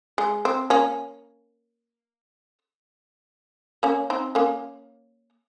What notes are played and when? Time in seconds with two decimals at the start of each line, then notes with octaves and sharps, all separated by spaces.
0.18 G#3
0.45 C4
0.70 A#3 C#4
3.83 A#3 C#4
4.10 C4 D#4
4.35 A#3 C#4